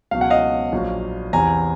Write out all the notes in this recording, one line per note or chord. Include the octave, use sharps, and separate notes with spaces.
C#2 B2 F#3 F5
F#5
D#5 F5
A#1 A#2 F#3
E2 C3 E3 G#5 A#5